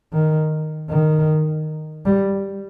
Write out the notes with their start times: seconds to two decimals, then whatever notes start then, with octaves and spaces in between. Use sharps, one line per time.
0.13 D#3
0.90 D#3
2.06 G3